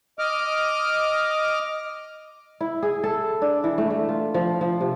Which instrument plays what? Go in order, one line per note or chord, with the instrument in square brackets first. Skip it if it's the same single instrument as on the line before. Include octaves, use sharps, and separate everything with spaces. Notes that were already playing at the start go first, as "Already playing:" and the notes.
[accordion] D#5 D6 F6
[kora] E4
G#4
A4
D4
E3
A3
A3
F4
F3
F3
C3